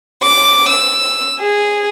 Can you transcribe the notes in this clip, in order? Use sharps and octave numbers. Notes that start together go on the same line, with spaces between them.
D6
E6
G#4